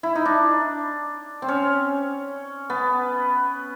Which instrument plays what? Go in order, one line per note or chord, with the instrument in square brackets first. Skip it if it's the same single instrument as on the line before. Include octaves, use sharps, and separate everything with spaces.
[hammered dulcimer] E4
D#4
D4
C4
C#4
B3